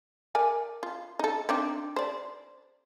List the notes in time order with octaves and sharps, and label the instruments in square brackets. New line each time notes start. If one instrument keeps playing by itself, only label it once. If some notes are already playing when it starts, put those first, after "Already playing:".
[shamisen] A#4 D5 G#5
F4
D#4 A4
C4 D4 D#4
C5 D5